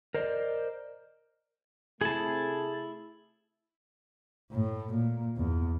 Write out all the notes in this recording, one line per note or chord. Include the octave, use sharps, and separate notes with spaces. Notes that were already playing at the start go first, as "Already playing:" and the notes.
A#4 C5 D5 D#5
C3 A3 E4 G#4 A5
A2
A#2
E2